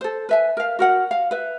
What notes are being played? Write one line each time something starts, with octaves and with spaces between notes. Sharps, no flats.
A4 C5
B4 E5 G#5
A#4 F5
F#4 A#4 F#5
F5
B4 E5